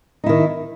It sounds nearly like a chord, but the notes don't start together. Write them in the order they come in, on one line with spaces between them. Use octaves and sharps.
D#4 E4 D#3